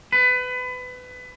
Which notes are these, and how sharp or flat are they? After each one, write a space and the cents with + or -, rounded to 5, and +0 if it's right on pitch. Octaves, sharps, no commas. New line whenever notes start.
B4 +25